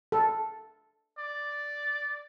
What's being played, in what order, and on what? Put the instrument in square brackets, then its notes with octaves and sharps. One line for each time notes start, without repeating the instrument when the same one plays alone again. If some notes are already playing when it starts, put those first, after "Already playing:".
[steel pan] A4
[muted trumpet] D5